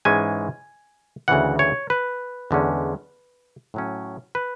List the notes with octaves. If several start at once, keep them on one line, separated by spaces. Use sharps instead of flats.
G#2 E3 G#3 C#4 G#5
D2 C#3 E3 F#5
C#5
B4
E2 D3 G#3 C#4
A2 F#3 C#4
B4